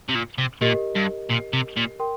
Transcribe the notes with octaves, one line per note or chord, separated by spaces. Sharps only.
C3
A#2
C3
A#2 G4 A#4 D#5
G2
A#2
C3
A#2
A#4 G5 C6